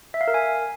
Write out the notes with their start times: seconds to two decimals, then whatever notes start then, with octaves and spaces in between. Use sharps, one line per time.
0.14 E5
0.21 F5
0.28 A#4
0.34 G#5